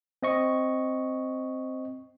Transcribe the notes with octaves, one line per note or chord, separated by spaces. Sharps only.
C4 D#5 C#6